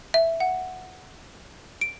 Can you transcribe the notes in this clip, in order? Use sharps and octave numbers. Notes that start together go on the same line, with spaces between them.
E5
F#5
D7